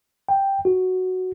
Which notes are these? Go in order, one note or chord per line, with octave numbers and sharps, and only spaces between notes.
G5
F#4